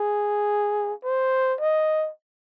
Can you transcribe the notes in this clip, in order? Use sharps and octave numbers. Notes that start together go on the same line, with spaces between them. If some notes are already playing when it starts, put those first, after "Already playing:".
Already playing: G#4
C5
D#5